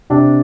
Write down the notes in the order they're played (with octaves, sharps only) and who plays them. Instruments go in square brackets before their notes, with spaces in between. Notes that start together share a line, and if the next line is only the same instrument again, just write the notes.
[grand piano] C3 D4